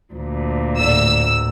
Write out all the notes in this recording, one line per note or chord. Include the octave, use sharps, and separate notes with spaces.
D2 A#2
D1 A3 D5 E6